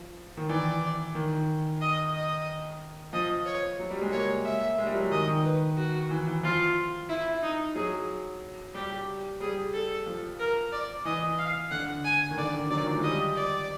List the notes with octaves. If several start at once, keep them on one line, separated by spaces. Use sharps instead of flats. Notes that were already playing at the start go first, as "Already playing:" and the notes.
Already playing: F3
D#3
E3 D5
D#3
D#5
D#5
F3 D#5
C#5
F#3
G3
G#3
A#3 C#5
E5
G#3
G3
F#3
D#3 D#5
D#3
B4
F#4
E3
E3
F3 F4
E4
D#4
F#3 G#4
G3 G4
G3 G#4
A4
F3
A#4
D5
E3 D#5
F5
D3 F#5
G#5
D#3
D3 D5
D#3
F#3 D5
D#3
F3
G#3
G3 D#5
D5